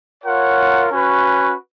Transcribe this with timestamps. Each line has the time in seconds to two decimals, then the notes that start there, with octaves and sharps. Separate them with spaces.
0.24 F4 A#4 C#5 F#5
0.89 C#4 F#4 B4